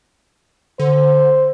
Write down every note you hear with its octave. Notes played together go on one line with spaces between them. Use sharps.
D3 C5